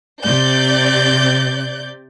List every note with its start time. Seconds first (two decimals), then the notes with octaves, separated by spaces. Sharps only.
0.23 C3 D5 G6